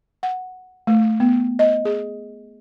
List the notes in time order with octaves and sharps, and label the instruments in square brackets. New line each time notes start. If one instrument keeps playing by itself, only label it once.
[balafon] F#5
A3
B3
D#5
G#4